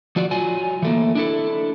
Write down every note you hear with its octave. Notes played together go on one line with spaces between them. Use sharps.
F3 F4 F#4 D5
F#3 F4 G#5
E3 A3 A#3
D4 E4 A4